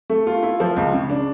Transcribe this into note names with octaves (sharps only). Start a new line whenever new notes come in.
A3
F4
E4
F3
C#2
C#3
D4